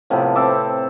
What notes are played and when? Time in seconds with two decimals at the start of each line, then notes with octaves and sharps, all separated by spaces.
0.10 A2 C3 F3 B3
0.35 C4 A4 E5 D6